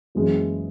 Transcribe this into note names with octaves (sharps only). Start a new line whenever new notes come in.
F#1 F#2 E3 G#3 C#4